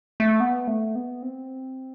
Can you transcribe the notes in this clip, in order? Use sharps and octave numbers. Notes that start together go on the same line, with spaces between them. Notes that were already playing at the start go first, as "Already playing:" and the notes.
A3
B3
A3
B3
C4